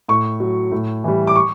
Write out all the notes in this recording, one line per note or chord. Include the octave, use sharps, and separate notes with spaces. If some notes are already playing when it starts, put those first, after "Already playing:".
A2 C#6
F#3
A2
E3 G3
D6
C#6